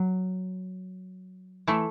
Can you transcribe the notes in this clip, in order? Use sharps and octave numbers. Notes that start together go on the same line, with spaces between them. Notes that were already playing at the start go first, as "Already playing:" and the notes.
Already playing: F#3
E3 A3